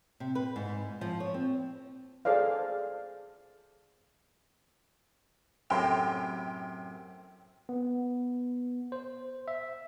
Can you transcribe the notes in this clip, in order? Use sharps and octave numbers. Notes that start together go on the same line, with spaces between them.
C3
B4
G#2
F3
C#5
C4
G#4 A4 C5 D5 F5
F#2 A2 C3 G5 C6
B3
C5
E5